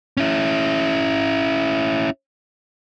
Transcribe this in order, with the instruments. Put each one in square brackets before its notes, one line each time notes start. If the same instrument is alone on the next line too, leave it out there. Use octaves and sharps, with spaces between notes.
[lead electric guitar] C#4 E4